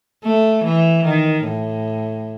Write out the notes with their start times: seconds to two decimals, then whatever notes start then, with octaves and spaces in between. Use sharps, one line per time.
0.24 A3
0.64 E3
1.05 D#3
1.45 A2